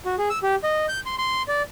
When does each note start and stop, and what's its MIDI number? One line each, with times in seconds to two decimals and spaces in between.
0.06 0.15 66
0.18 0.29 68
0.30 0.39 88
0.43 0.55 67
0.64 0.86 75
0.89 1.00 91
1.06 1.15 84
1.18 1.42 84
1.48 1.62 74